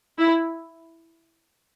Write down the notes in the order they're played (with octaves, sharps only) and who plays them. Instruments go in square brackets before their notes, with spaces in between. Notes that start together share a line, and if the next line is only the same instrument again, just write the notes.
[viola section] E4